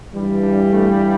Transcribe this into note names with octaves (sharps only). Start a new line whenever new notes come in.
G2 E3 G3
D4
A3